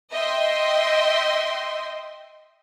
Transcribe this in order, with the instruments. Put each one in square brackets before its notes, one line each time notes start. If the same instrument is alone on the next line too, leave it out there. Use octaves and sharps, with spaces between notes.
[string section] D#5 E5 G5 C6